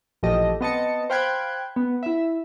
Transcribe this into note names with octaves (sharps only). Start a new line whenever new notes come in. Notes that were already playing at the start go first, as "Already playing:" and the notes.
A1 A#2 F3 G4 A4 D#5
B3 C4 D#5 A5 A6 C#7
C5 F5 G5 B5 F#6 G#6
B3
E4 E5